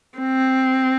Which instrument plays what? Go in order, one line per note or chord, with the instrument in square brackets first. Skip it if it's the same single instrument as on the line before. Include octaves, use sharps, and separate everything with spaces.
[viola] C4